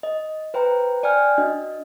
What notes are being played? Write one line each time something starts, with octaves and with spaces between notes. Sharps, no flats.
D#5
B4 C5 G5 A#5
D5 G5 G#5 F6
D4 F#4 D#5